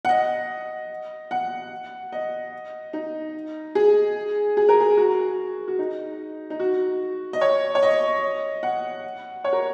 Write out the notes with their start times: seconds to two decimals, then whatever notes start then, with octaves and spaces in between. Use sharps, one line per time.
0.05 F#5
0.09 D#5
1.31 F#5
2.13 D#5
2.93 D#4
3.75 G#4
4.57 G#4
4.69 A#4
4.80 G#4
4.97 F#4
5.68 F#4
5.79 D#4
6.50 D#4
6.60 F#4
7.33 D#5
7.41 C#5
7.75 C#5
7.83 D#5
8.63 F#5
9.44 C#5
9.53 A#4